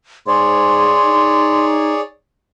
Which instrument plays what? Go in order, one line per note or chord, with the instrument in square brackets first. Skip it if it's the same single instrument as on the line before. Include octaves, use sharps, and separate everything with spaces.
[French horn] G#2 [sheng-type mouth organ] G#4 C#5 D5 [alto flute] C6
[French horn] D#4